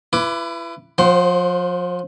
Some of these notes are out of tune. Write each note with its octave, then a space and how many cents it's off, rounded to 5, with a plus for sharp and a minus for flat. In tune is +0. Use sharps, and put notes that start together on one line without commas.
E4 +35 B4 +0 D6 +0
F3 +35 C5 +0 G5 -45